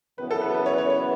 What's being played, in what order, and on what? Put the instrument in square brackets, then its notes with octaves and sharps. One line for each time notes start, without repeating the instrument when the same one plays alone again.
[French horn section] F#2 C#3 E3 B3 [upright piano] B4
[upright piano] A4
B4
B4
C#5
C#5
C#5